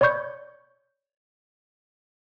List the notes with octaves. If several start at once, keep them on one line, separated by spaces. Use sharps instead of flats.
C#5 D5 B5 C#6 G6